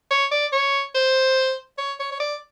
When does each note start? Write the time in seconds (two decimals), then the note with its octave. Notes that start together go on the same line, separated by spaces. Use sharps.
0.11 C#5
0.32 D5
0.53 C#5
0.95 C5
1.78 C#5
2.00 C#5
2.12 C#5
2.20 D5